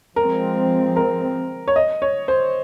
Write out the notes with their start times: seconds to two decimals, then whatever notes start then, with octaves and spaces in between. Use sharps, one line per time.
0.16 F3 G#3 C4 A#4
0.96 A#4
1.68 C#5
1.76 D#5
2.02 C#5
2.28 C5